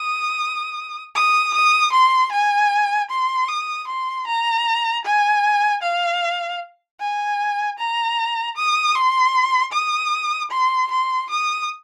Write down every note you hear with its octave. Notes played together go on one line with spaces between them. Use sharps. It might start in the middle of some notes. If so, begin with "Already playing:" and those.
Already playing: D#6
D#6
D#6
C6
G#5
C6
D#6
C6
A#5
G#5
F5
G#5
A#5
D#6
C6
D#6
C6
C6
D#6